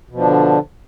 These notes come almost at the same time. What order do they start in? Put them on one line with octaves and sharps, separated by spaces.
B2 F3 D4 D3